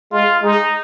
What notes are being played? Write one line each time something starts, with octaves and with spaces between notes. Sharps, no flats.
G#3 F4
G#3 D#4